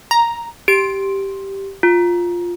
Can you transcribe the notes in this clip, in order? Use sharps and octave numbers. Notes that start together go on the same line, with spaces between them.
A#5
G4 D7
F4